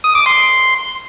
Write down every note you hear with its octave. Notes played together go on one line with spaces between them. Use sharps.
D#6
D6
C6